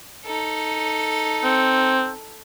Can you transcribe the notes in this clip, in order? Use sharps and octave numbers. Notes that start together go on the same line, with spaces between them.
D#4 A4
C4